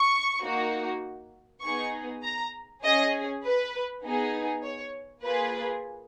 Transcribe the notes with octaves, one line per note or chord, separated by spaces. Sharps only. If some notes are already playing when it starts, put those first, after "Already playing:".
Already playing: C#6
A#3 D#4 F#4
B3 D#4 G#4 C#6
A#5
C#4 G#4 D#5
B4
B3 D#4 G#4
C#5
A#3 F4 G#4 B4